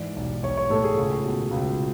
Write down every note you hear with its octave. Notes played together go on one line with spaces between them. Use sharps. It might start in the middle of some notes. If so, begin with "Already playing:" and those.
Already playing: G#2 E3 D5
B1
B1 C#5
C#5
A2 A4
G#4
C#2
B2
C#2